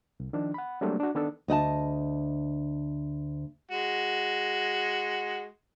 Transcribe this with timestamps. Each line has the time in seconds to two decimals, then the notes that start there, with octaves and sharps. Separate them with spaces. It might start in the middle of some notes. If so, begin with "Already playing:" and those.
0.20 C2
0.33 D#3 F3 D4
0.54 F#5 B5
0.81 F#3 G3 A3 A#3 C4 D4
1.00 D4 F#4
1.15 D#3 B3 D4 A4
1.48 D2 D#5 F#5 A5
3.71 G#3 F#4